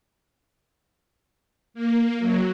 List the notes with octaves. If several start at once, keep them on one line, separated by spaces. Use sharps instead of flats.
A#3
F#3